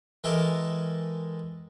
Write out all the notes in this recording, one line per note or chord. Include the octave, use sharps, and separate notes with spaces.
E3 G#3 G4 A4 A#4